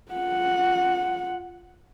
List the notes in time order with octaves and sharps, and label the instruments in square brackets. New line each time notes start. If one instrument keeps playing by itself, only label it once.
[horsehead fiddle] F4 F#5